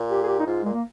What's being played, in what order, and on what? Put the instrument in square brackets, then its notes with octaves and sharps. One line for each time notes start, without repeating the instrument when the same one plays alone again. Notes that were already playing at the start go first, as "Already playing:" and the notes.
Already playing: [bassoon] A#2
[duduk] G4
G#4
G4
D#4
[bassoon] G#2 [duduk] F4
[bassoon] A#2 [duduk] G#3
[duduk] A#3